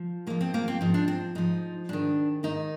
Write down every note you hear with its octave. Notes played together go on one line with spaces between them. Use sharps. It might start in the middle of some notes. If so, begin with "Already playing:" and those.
Already playing: F3
G#2 F3 A#3
C4
A#3
C4
G#2 F3 D#4
D4
C4
G#2 F3 D#4
G#2 D#3 D4
G#2 D#3 D#4